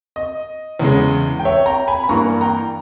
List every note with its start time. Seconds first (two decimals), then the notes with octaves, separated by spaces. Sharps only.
0.16 D#5
0.79 E2 C#3 G#3
1.39 G5
1.45 C#5 E5
1.66 G5 A#5
1.88 G#5 B5
2.04 B5
2.09 G2 E3 A#3 A#5 C#6
2.41 G5 A#5